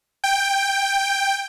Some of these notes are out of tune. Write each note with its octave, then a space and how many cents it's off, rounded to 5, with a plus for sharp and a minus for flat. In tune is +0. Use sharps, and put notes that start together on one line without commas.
G5 +10